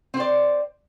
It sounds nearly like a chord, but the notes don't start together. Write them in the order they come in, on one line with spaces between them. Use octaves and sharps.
C4 C5 D5